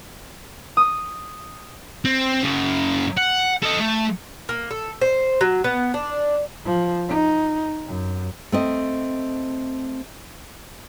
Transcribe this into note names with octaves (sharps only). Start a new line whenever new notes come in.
D#6
C4
F#2 C#3
F#5
A4 D#5
A3
A#3
A4
C5
F#3
B3
D4
F3
D#4
F#2
A3 C4 D#5